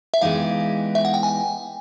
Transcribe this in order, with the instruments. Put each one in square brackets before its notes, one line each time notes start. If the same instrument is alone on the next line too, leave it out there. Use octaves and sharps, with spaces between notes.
[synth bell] E5
[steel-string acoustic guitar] E3 G#3 B3 D#4 G4 [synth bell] F5
[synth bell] E5
F#5
G5
G#5